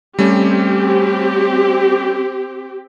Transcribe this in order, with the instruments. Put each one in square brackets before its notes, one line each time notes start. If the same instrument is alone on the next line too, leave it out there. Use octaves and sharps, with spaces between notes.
[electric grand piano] G3 A3 C#4 [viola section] C4 G4